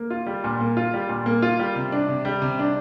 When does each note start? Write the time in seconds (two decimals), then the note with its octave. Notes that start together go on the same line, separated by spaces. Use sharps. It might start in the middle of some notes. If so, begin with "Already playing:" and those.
Already playing: A#3
0.10 F4
0.26 G3
0.44 A#2
0.60 A#3
0.77 F4
0.94 G3
1.09 A#2
1.26 A#3
1.42 F4
1.59 G3
1.76 C3
1.92 D4
2.08 C3
2.25 G3
2.42 C3
2.59 D4